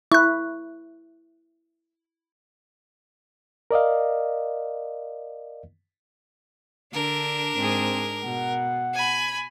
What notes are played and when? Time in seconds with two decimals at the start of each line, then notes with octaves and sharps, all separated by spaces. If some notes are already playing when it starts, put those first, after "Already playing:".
0.12 E4 C#6 F#6
3.71 A#4 D5 D#5 F5
6.93 D3 D4 A#4
7.56 G#2 C4 G#4
8.24 B2 F#5
8.94 G#5 B5